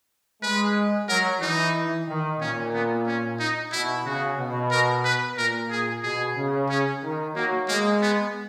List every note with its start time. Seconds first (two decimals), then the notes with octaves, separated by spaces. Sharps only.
0.43 G#3 B4
1.08 F#3 A#4
1.41 E3 D#4
2.08 D#3
2.40 A#2 C#4
2.73 B3
3.07 C#4
3.39 D#4
3.72 B2 E4
4.06 C#3 F#4
4.38 B2
4.71 A#4
5.04 B4
5.37 A#2 A#4
5.71 G#4
6.03 B2 G#4
6.37 C#3
6.69 C#4
7.03 D#3
7.35 F#3 A#3
7.68 G#3 A#3
8.02 B3